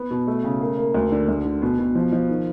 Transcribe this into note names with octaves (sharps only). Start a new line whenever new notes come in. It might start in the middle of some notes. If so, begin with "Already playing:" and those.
Already playing: B3
B2
A3
C#3
A#3
A#3
D2
D3
D2
D3
B2
B2
F3
F3
D#3